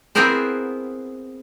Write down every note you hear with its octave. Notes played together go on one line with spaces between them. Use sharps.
B3 C4 E4 G#4 A#4 C5